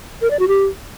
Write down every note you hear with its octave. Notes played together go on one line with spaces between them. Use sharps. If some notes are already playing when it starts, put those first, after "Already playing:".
A#4
D5
F#4
G4